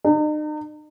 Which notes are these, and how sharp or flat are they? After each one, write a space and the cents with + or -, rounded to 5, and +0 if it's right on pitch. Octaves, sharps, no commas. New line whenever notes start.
D#4 -40